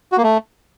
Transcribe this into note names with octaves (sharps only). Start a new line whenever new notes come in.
F#4
A#3
A3